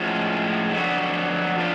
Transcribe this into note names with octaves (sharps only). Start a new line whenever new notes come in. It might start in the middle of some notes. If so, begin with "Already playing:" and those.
Already playing: A2 F3 G#3 C#4 F#4
F2 D3 F#3 B3 F#4
F3 B3 D4 F4